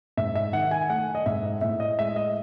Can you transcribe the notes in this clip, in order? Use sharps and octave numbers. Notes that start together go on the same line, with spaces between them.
G#2 E5
E5
D#3 F#5
G#5
A3 F#5
D#5
G#2 E5
A2 E5
D#5
G#3 E5
D#5